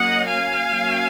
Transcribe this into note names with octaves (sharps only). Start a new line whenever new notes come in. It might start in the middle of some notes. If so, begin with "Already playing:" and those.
Already playing: F#3 A#3 C#4 D#5 F#5
F5 G#5
F#3 A#3 C#4